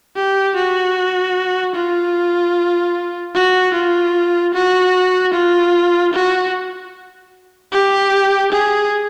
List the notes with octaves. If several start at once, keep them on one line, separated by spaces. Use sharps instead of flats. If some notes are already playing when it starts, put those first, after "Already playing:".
G4
F#4
F4
F#4
F4
F#4
F4
F#4
G4
G#4